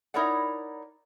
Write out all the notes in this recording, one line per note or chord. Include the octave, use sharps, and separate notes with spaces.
D#4 E4 A#4 C#5 D5 F#5